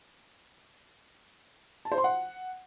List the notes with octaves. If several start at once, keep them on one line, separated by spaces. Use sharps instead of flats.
A5
C5
C6
F#5